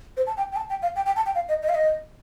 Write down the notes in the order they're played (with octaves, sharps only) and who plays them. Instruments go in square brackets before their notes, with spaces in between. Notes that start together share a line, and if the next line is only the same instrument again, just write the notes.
[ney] C5
A5
G5
G5
A5
G5
F5
G5
G5
A5
G5
F5
D#5
D#5
F5
D#5